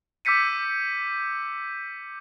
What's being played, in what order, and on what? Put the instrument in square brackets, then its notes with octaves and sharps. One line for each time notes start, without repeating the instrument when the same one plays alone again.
[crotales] D6 E6 G6 B6 C#7 D#7